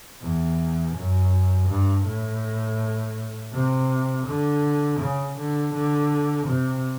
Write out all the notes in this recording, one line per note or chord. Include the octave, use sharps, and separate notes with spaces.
E2
F#2
G2
A2
C3
D3
C#3
D3
D3
C3